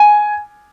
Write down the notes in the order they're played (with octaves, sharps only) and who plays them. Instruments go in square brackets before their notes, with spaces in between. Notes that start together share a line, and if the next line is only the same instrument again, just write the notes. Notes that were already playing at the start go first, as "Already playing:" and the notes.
Already playing: [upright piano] G#5